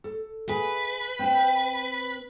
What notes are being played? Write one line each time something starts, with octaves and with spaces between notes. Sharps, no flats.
A4
G#4 B4 E5 G#5
C4 G5